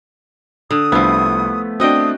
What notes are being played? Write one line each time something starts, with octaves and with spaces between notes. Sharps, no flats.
D3 D#6
C2 F3 A3 B3 E4
C4 D4 F#4 D#5 G5 D#6